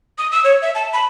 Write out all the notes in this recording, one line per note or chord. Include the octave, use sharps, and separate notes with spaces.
D#6
E6
C#5
E5
A5
B5